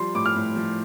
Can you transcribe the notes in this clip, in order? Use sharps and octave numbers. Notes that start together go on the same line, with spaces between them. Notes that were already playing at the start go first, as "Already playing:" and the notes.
Already playing: F3 G3 C6
A2 D6
F6
A2
F3